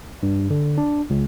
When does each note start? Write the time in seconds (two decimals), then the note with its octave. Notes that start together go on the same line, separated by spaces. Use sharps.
0.23 G2
0.50 D3
0.78 D4
1.10 C#2